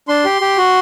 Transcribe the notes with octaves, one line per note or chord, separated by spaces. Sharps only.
D4 C6
G4
G4
F#4